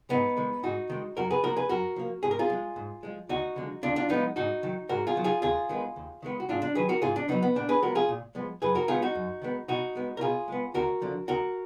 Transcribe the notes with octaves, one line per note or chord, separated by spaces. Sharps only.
G#2 B3 D#4
D#3 G#3
G#2 D#4 F#4
D#3 G#3
F#2 F#4 A#4
G#4 B4
F3 A#3 F#4 A#4
G#4 B4
F#2 F#4 A#4
F3 A#3
G#2 G#4
A#4
F4 G#4
F3
G#3
G#2
F3 G#3
D2 D#4 F#4
D3 F3 G#3
D2 D4 F4
D4 F4
D3 F3 G#3 B3 D#4
G#2 D#4 F#4
D#3 F#3
G#2 F#4 A#4
F4 G#4
D#3 F#3
F4 G#4
D#2 F4 G#4
D#3 G#3 B3
D#2
D#3 G#3 B3
F#4
G#2 D4 F4
D4
D#3 F#3 G#4 B4
F#4 A#4
G#2 F4 G#4
D4
D#3 F#3 B3 D#4
B3
A#2 D4
G#4 B4
F3 G#3 B3 F#4 A#4
F4 G#4
A#2
F3 G#3 B3
F#2 G#4 B4
F#4 A#4
D#3 G#3 B3 F4 G#4
D#4 F#4
F#2
D#3 G#3 B3
B2 D#4 F#4
G#3 B3
A#4
B2 F4 G#4
G#3 B3
D2 F#4 A#4
D3 F3
D2 F#4 A#4